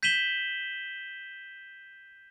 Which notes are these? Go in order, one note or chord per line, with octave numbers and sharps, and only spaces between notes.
G6 B6 D#7 E7 F#7 G7